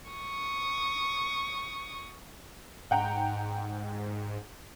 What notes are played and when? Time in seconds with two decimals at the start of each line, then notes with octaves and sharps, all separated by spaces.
0.10 C#6 D#6
2.91 G#2 F#5 G5 A#5